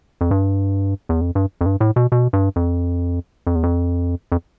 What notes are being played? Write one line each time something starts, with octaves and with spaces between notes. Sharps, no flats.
F2
G2
E2
F2
G2
F2
G2
A2
B2
B2
G2
F2
F2
E2
F2
F2